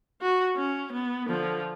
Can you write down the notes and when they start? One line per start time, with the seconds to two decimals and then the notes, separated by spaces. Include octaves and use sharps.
0.21 F#4
0.56 C#4
0.93 B3
1.26 D3 F3